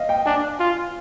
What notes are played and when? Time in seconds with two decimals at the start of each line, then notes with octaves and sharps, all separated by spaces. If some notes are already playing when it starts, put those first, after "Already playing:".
Already playing: D#5 F5
0.09 G5
0.26 D4 G#5
0.59 F4